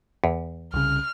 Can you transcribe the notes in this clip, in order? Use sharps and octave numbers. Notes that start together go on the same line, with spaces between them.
E2
C2 C#3 F6